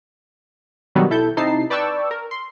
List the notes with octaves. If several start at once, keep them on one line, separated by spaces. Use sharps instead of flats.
B2 D3 D#3 F#3 G3 B3
B1 E4 A4 G6
C3 D#4 E4 A5 C7
B4 D5 G5 A5 C#6 E6
A#4
C6